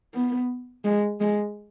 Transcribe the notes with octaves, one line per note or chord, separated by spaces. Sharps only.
B3
G#3
G#3